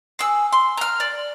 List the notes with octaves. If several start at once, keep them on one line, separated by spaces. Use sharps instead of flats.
G#4 E6
C6
A#5 F6
D5